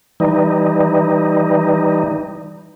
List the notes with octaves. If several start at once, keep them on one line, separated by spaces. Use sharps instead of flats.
E3 G3 D#4